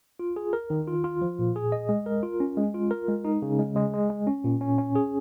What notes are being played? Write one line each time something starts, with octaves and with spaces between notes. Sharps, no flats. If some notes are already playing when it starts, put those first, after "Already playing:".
F4
G#4
A#4
D#3
F4
F4
F3
A#2
G#4
D#5
G#3
A#4
F4
C#4
G#3
F4
A#4
G#3
D#4
C#3
G#3
G#3
G#3
G#3
C#4
A#2
C#4
C#4
G#4